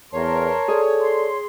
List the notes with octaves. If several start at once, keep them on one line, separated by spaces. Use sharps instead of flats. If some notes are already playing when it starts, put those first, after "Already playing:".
E2 A#4 C#5 A5 C6
G#4 A4 D5
C6